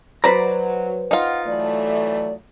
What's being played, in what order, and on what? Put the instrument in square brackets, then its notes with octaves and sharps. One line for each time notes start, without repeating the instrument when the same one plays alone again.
[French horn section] F#3 [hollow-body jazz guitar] B4 C5 A#5 [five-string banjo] D5
[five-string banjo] D#4 F4 [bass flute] F#5
[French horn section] E3 F#3 A3 [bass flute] D5